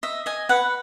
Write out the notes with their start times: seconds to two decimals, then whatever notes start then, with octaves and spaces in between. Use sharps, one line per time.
0.03 D#5 E5
0.26 D#5 G#5
0.49 B4 F#5